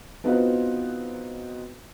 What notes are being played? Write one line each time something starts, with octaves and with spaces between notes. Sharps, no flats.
B3 C4 D#4 F4 F#4 B4